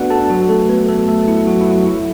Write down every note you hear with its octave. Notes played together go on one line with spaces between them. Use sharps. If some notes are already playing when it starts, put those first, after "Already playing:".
Already playing: A3 B3 D4 F#4 A4 B4 D5 F#5
A4 A5
F#3 F#4
A3 A4
B3 B4
A3 A4
A3 A4
E4
F#3 F#4
E4
F#3 F#4
E4